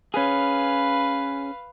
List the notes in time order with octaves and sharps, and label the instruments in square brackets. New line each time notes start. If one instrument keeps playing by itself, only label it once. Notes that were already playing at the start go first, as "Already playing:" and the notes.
[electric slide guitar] C#4 G#4 [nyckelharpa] B4 F5